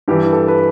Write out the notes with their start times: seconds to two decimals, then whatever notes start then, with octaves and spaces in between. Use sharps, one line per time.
0.08 G2 E3 G4
0.33 A4
0.48 B4